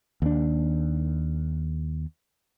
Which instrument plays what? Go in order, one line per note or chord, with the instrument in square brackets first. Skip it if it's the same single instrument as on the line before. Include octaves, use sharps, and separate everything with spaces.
[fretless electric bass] D#2 D4